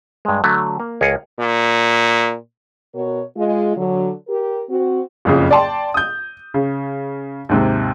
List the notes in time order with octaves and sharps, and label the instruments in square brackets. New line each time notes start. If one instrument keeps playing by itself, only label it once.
[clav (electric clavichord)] G2 G#3
D3 F#3 A3
A#3
C#2 G#4 A#4 C#5
[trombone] A#2
[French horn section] B2 F#4 A#4 C#5
G#3 F4
D3 F#3
G4 A#4
C4 F#4
[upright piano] F#1 F2 C#3
D5 G5 A5 C6
D#6 G6
C#3
D#2 G#2 C3